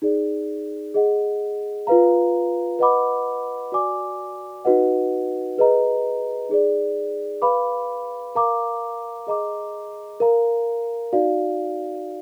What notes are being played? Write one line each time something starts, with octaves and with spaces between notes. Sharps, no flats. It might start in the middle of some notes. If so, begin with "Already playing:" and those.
D#4 G#4 D5
G#4 D#5 F#5
F4 B4 F5 A#5
B4 D#5 F#5 B5 D6
F#4 D5 G#5 D6
D#4 F#4 B4 D#5 F#5
G#4 B4 D#5 A#5
D#4 G#4 D5
B4 F5 B5 D6
A#4 F5 A#5 D6
G#4 D#5 A#5 D6
A#4 F5 A#5
D#4 F#4 D5 F5